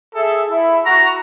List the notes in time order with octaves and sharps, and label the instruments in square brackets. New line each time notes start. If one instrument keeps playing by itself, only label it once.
[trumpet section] G#4 A4 E5
E4
[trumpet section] F#4 [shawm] A#5